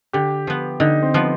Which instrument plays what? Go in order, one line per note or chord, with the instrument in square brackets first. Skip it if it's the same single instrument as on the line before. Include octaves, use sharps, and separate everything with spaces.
[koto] D3 [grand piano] G4
[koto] F3 B3
[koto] D3 [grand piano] D#4
[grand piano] C4
[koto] F3 B3